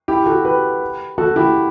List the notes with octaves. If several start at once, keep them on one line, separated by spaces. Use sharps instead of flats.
E4 G4
F#4 A4
G4 B4
F#4 A4
E4 G4